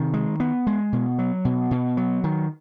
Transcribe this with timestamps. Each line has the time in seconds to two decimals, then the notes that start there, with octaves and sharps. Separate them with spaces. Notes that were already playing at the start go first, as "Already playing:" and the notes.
Already playing: C3 D#3
0.14 G#3
0.40 B3
0.67 G#3
0.93 B2
1.18 F#3
1.45 B2
1.71 B2
1.97 F#3
2.24 D#3